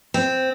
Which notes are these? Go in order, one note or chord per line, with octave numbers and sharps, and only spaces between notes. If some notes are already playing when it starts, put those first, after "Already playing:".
C4